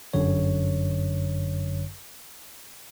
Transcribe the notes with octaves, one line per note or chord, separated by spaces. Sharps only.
G1 F#2 D3 C#5